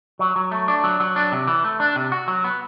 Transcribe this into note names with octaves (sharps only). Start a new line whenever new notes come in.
F#3
F#3
A3
D4
F#3
F#3
D4
C3
E3
A3
D4
C3
F#4
F#3
B3